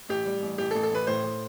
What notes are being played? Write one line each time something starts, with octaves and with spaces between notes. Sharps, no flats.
A1 G4
G3
A1
A1 G4
A4
A1
A4
A1 B4
A2 C5
A2